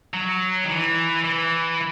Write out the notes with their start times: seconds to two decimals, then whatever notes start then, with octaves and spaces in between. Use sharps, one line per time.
0.14 F#3
0.64 D#3
0.68 E3
1.24 E3